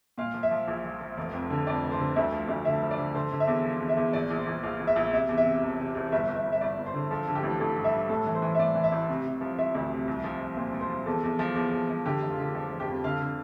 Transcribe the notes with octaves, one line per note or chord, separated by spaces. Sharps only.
A#2 F5
F3
E5
F3
A#1
F3
F3
F1
F2
D3
F2 D5
F1
C5
D3
D2 E5
F3
D2
D3 E5
F3
D5
D3
D3 C5
D3
E5
E2
F3
E2
E5
E2
A#1 D5
A#1
C5
A#1
A#1 F5
A#1
E5
A#1
C3 E5
E2
E5
C3
E1
C3
E1
G1 E5
G1
E5
G1
E5
G1 D5
G1
C5
D3
F3 A4
D3
G4
A1
A1 A4
G2
E5
G2
A2 A4
E3
C5
E3
E5
A2 D5
E3
E5
A1
C3
C3
F3
F3 E5
D2
C3
C2
F3
F3
A#2 C5
F3
C5
F3
E2 A4
E2
F3
E2
E2
F3
D3 G4
F1
F4
D3
F3
F1
G4
F2
D3 F5
D3